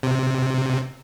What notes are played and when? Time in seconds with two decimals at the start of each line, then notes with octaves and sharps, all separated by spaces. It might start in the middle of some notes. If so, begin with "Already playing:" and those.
0.03 C3